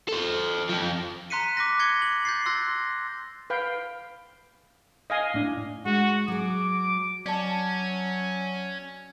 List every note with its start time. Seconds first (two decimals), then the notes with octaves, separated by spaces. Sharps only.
0.09 A4 C5
0.69 F2 F3
1.30 A#5 C6 F#6 B6 C#7 D#7
1.57 D6 F#6 A#6
1.80 G#6 C#7 G7
2.02 F#7
2.25 G6 A6 C7
2.46 C6 E6 F#6 A6 A#6
3.50 B4 F5 G5
5.10 D#5 F5 G#5
5.34 A2 D4
5.85 G#3 F#4
6.28 F#3 G#4 D6
7.26 F#3 C#4 D5 A5